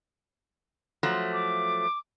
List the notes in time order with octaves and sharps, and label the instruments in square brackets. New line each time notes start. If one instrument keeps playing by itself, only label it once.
[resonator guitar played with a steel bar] F3 F#3 A3
[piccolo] D6